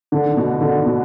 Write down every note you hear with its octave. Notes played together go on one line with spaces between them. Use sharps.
D3
B2
D3
B2